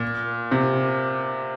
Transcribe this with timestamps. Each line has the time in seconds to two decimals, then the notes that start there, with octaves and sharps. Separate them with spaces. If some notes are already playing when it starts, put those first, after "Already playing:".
Already playing: A#2
0.51 C3